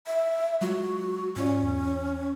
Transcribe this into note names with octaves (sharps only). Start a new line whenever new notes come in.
E5
F#3 G#3 F4 F#4
G#2 C#4 F4 D5
E2